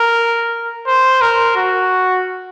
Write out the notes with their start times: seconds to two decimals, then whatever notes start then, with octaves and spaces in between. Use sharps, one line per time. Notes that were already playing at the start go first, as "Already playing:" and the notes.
Already playing: A#4
0.87 C5
1.21 A#4
1.57 F#4